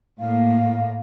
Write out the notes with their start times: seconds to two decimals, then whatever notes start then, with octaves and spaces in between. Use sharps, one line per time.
0.20 A2 A#3 F5